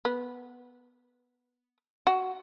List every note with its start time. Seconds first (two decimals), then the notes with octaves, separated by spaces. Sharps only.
0.05 B3
2.07 F#4